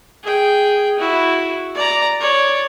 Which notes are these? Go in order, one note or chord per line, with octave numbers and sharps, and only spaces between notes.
G#4 G5
E4 F#4
D5 A#5
C#5 D5